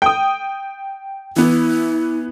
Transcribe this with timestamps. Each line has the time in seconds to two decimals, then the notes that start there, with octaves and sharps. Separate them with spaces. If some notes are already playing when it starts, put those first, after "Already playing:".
0.02 G5 D#6
1.36 E3 B3 E4